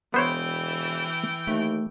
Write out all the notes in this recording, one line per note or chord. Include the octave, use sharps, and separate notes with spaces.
E1 E3 B3 C5 C#5 G5
D#2 A3